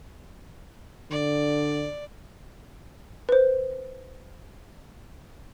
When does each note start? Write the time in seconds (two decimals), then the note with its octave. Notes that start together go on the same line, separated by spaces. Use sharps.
1.11 D3 D5
3.29 B4 C5